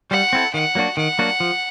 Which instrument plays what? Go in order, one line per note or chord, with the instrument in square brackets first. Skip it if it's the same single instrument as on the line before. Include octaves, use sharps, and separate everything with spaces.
[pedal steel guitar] G3 [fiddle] F#5
[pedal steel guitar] C4 E4 A4
[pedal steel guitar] D#3 [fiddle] F#5
[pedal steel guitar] F#3 A#3 D4 F#4
[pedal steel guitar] D#3 [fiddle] F#5
[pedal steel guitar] F#3 A#3 D4 F#4
F3